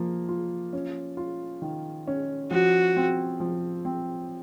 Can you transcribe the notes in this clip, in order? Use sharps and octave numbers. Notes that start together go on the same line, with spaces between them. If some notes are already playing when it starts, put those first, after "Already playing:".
Already playing: F3 A#3
F4
C#4
F4
D#3
C#4
F3 F#4
C4
F3
C4